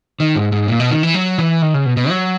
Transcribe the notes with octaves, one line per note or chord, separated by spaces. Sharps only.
D#3
G#2
G#2
A#2
B2
D#3
E3
F#3
E3
D#3
C#3
B2
B2
F#3